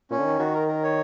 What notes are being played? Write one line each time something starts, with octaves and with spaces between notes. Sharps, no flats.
A#2 C#4
D3
D#3
D#3 F#4
A#4
A#4
C#5